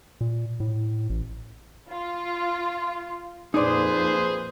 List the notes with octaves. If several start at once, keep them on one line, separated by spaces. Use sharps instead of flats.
A#2
A2
A1
F4
F2 A#2 D#4 G#4 B4 C5 D5